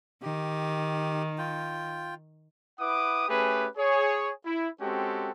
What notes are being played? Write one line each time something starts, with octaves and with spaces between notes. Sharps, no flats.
D#3 G4
F4 G5
E4 B4 F#5 D6 D#6
A3 C#4 G4 G#4 B4
G#4 C#5
E4
G#3 C4 C#4 F#4 G4 A4